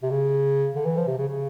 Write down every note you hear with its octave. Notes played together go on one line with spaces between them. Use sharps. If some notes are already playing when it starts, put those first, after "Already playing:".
C3
C#3
D3
E3
F3
C3
C#3
C#3